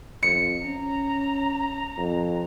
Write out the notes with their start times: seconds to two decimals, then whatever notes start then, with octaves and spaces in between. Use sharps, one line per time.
0.23 F2 C#7
0.65 C#4 A#5
1.98 F2